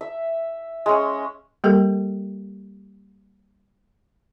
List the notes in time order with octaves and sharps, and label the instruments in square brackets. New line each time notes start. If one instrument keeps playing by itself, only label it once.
[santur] E5
G#3 C#4
[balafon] G3 A#3 G4 A4 A#4